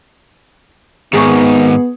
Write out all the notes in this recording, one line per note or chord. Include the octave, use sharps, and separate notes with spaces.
G#2 D#3 B3 G#4 C#6